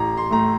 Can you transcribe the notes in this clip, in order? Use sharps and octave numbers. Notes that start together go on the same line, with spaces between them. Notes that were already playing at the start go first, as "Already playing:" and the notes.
Already playing: A1 A#5
C6
A2 A3 A#5